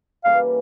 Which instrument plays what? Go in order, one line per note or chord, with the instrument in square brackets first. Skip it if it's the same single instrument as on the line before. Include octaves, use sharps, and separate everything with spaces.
[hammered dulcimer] C#3 E3 G3 A#3 [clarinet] F5